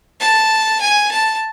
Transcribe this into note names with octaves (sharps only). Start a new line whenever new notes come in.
A5
G#5
A5